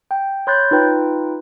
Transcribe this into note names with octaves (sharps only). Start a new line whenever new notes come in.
G5
C#5 B5 C6 F#6 G6 A6
D#4 F4 B4 G5